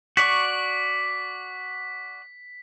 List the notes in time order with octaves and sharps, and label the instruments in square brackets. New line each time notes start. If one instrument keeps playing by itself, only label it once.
[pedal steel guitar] F#4 D5 C#6 [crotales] B6